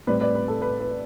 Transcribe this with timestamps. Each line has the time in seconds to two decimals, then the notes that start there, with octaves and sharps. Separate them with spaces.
0.07 A2 G3 C4 B4 D5
0.21 B4 D5
0.35 B4
0.48 A4
0.62 B4
0.80 B4